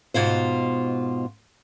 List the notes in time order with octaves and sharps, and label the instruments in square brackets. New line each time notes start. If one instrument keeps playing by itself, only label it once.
[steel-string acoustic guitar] G#2 B2 F4 C5